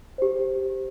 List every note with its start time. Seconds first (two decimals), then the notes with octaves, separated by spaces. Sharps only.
0.18 G4 C5